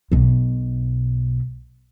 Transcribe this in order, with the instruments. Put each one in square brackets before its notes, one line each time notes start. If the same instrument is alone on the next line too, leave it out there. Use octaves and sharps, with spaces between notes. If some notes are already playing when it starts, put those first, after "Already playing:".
[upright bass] B1 B2